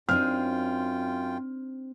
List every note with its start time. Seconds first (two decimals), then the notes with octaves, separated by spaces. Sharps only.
0.09 F#2 C4 D4 D#4 F4 G5 F6